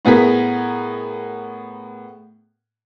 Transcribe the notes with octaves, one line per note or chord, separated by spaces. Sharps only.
A2 B3 G#4 A#4 B6